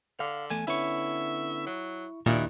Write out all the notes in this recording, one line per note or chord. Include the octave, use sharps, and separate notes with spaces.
D3 F5
E2 A3 G#5
D3 B3 C#4 E4 E5 C#6
F#3
D#2 A#2 D#3 D4 E4 F#6